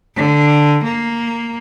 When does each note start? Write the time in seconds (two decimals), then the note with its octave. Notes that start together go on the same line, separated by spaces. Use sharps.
0.16 D3
0.84 A#3